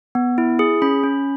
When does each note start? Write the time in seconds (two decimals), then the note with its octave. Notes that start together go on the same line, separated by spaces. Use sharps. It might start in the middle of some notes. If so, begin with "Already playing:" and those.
0.15 B3
0.38 E4
0.59 G#4
0.82 C#4 B5
1.03 C#4